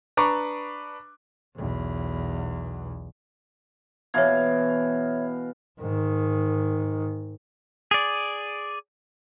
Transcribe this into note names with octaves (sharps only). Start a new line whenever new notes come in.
D4 B4 A#5 C#6 D6
B1 E2
B2 E3 C#5 E5 F5 G#6
G#2 D#3
G#4 D5